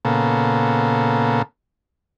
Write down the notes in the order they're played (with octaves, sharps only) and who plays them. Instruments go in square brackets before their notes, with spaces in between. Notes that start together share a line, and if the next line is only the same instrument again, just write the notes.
[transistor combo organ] A#2 C#3 A#3 B3 A4